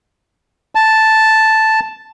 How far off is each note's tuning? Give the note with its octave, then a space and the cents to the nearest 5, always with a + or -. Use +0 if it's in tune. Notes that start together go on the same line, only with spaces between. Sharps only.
A5 +0